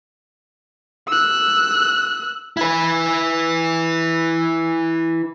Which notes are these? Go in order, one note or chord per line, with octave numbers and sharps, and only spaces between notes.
E6 F#6
E4 B4